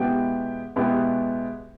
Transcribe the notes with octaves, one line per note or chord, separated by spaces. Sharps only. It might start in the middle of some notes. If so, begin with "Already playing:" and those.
Already playing: B2 G#3 B3 E4 G4
B2 G#3 B3 E4 G4